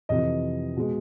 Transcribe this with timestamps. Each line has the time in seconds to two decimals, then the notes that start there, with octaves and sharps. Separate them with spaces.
0.09 F2 C3 E3 D#5
0.76 B2 G#3